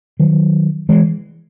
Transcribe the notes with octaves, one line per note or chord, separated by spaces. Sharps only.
D#3 F#3
E3 G#3